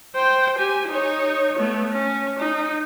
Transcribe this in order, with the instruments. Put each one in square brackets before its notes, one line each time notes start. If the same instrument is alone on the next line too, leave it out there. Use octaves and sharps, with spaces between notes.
[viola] C5 G5
G4 G#5
D#4 C#5
A3 B3
C#4
D#4